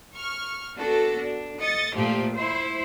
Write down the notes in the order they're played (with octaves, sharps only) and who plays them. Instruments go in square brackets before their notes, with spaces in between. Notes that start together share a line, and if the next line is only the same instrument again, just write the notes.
[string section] C#6 F6
B3 D4 F#4 A4
D4
D#5 A6 C#7
A#2 F3 A3 G4
E4 C5